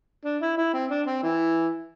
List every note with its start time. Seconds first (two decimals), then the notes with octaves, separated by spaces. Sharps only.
0.25 D4
0.41 E4
0.57 E4
0.74 C4
0.90 D4
1.07 C4
1.23 E3